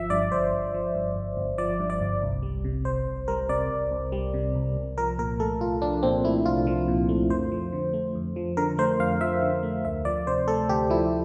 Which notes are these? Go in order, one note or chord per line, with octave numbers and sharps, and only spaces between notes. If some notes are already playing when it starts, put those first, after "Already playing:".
Already playing: G1 F3 E5
G2 D5
G1 C5
G1
F3
G2
G1
G1
F3 D5
G2
D5
G1
C2
G3
C3
C2 C5
C2
G3 A#4
C3 D5
C2
C2
G3
C3
C2
C2
F3 A#4
A#2 A#4
A3 A4
C2 F4
F3 D4
A#2 C4
A3 E4
C2 F4
F3
A#2
A3
F2 C5
F3
D3
A3
F2
F3
D3 A#4
A3 C5
F2 F5
F3 E5
D3
A3
D2 E5
F3 D5
C3 C5
A3 A4
D2 G4
F3 E4